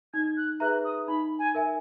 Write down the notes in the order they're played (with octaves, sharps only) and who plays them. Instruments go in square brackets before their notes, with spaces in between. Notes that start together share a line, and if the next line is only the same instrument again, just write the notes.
[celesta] D#4 [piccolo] G#6
[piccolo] F#6
[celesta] G#4 B4 E5 A#5 [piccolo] F#6
[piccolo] D#6
[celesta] D#4 [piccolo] B5
[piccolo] G#5
[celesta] A#4 E5 G#5